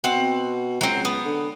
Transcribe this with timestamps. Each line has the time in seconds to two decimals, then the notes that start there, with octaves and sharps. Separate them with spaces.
0.04 B2 C4 F#5
0.81 C#2 F#3 C4
1.05 B3
1.25 D3